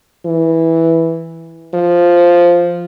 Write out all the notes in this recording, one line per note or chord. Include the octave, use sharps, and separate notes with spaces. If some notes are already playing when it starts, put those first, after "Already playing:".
E3
F3